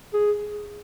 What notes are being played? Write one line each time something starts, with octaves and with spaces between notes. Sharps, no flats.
G#4